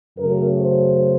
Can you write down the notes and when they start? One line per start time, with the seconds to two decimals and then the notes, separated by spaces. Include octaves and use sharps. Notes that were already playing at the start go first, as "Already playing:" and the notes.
0.18 F#2 C#3 F#3 A3 A#4
0.62 C5